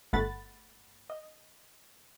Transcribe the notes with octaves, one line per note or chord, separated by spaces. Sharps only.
G1 A3 F#5 B5 A6
D#5